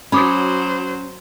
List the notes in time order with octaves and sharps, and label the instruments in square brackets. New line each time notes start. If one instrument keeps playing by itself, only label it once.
[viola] F#3 C5 [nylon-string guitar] C#4 F#4 [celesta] B5 D6 D#6